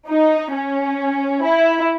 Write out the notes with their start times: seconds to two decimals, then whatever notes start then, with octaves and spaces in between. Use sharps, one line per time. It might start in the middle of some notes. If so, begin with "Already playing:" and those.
0.08 D#4
0.53 C#4
1.42 E4